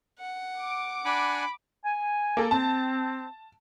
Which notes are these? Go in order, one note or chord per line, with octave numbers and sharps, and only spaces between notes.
F#5
D6
D4 F#5 G#5 B5
G#5
A#3 A4
C4 A5